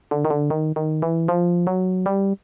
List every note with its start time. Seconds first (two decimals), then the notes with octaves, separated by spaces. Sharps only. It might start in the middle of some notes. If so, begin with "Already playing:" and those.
0.11 D3
0.25 D#3
0.30 D3
0.50 D#3
0.76 D#3
1.02 E3
1.28 F3
1.67 F#3
2.06 G3